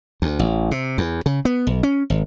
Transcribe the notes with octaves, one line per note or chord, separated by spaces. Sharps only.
D2
A1
C3
E2
C#3
B3
B1
C#4
G#1